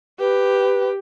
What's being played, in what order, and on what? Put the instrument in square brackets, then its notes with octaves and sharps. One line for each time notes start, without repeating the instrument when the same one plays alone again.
[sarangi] G4 [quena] B4